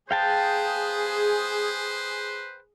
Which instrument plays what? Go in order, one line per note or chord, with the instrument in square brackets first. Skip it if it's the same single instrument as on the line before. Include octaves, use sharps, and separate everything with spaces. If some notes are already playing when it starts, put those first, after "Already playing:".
[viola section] G#4 [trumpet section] B4 C5 [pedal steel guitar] F5 G5 A5